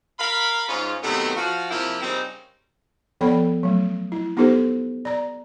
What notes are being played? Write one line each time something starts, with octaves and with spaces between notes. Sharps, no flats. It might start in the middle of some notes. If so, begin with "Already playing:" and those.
A#4 F5 B5
G#2 C#4 F4
F#2 C3 D#3 A3 B3
F3 F#4 F5
C3 F3 A#3 E4 G4
C#3 G3 A#3 C4 C#4 D#4
F3 B3 A4 D5 G5 B5
F#3 A3
E4
B3 D#4 F4 G4 A4 C5
D5 A#5